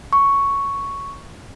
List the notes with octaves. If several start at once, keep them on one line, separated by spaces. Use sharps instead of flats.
C#6